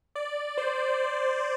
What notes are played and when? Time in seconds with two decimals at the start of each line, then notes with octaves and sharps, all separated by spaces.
0.15 D5
0.57 C5